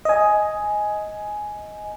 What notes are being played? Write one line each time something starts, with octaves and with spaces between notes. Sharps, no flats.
D#5 G#5